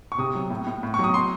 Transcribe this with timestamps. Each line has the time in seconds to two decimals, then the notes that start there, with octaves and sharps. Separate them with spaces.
0.12 C#6
0.18 C3 D#6
0.35 F#3
0.50 A2
0.67 A2
0.83 A2
0.94 C#6
0.99 F#3
1.04 D#6
1.14 C6